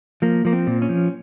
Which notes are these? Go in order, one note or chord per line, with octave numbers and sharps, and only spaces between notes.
F3 A#3
F3 A#3
C4
A#2
C#4
F3